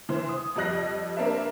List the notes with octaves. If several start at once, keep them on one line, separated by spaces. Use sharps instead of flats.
E3 C5
D#6
F2 G3 D#5 F#6 A#6
A#3 C4 D4 B4 E5